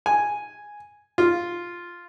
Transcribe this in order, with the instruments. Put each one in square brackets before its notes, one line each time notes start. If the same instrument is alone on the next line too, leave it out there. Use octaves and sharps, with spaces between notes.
[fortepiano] G#5
F4